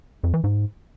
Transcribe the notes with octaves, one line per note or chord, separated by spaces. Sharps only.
F2
E3
G#2